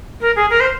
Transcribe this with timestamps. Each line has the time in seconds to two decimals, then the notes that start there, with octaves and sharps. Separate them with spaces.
0.21 A#4
0.36 G#4
0.50 A#4
0.60 C5